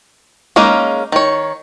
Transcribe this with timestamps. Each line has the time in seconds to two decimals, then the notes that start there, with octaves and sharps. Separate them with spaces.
0.56 G#3 A#3 C#4 D#4
1.12 D#3 C#5